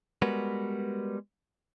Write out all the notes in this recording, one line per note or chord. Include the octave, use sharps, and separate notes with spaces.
G3 G#3 B3 F#4 A#4 B4